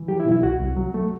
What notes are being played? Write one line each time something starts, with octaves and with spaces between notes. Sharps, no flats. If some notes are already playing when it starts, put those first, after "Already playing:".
Already playing: E3
F#3 G4
E4
B2
E4
C2 F#4
C2
F#3
A3